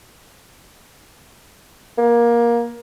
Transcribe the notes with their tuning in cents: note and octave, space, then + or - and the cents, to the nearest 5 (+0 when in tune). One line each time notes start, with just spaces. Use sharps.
A#3 +20